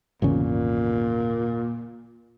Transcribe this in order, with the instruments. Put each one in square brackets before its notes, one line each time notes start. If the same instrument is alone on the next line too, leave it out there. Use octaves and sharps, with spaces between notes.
[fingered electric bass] G#1 E2 C#3 [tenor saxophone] A#2